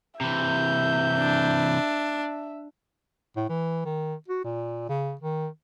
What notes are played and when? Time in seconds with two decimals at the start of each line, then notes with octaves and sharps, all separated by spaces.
0.21 C3 E3 E5 G6
1.19 D4
3.36 A2
3.49 E3
3.85 D#3
4.28 F#4
4.44 A#2
4.89 C#3
5.21 D#3